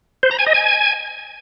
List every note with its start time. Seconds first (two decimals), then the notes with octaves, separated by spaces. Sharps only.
0.23 C5
0.31 A#5
0.39 G#5
0.46 D#5
0.54 G#5